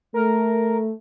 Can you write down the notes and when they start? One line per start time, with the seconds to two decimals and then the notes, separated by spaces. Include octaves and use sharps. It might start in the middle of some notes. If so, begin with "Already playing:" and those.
0.14 A3 A#4